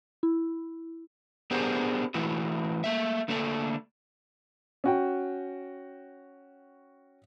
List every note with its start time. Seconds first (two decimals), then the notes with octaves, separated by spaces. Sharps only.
0.23 E4
1.51 B3 D4 G4 G#4 A#4 C5
2.14 E3 A3 E4 F#4
2.84 A3 A#3 E5
3.28 D3 A3 A#3 D4 A4
4.84 C#4 F#4 G5